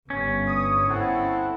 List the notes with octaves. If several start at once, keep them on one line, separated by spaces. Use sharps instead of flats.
G1 G2 C#4
D#6
C4 E4 A4 F#5